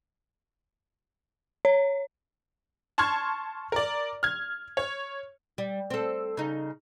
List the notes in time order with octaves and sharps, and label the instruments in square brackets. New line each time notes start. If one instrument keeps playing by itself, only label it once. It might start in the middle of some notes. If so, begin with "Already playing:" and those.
[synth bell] C#5
[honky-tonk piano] A5 C6 C#6 F6 G#6
A#4 D5
F6 G#6
C#5
[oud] G3
C4 A4
C#3 D#4